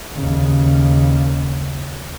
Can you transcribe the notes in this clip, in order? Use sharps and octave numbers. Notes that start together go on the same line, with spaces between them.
D#2 C#3